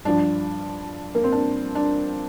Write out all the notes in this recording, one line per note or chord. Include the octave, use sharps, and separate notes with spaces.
G2 F3 D4
A#3
C4
D4
D4